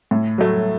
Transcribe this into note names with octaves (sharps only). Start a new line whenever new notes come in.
A2
F#3 A3